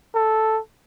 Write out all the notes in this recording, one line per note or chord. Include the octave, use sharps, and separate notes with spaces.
A4